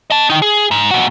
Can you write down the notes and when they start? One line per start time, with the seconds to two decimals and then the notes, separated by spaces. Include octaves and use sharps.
0.10 D#5 A5
0.30 D#3 D#4
0.42 G#4
0.71 G#2
0.91 A#2 F#4